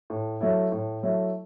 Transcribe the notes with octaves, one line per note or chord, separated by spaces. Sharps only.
A2
F#3 A3 E4
A2
F#3 A3 E4